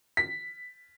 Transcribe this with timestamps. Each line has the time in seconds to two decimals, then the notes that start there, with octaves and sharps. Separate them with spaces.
0.17 B6